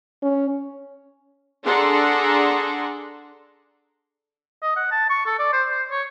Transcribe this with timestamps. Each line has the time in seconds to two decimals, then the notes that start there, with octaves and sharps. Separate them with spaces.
0.23 C#4
1.65 D4 G#4 A4 F#5 A#5 C6
4.62 D#5
4.76 F#5
4.92 A5
5.10 C#6
5.26 A4
5.39 D5
5.53 C5
5.71 C5
5.91 C#5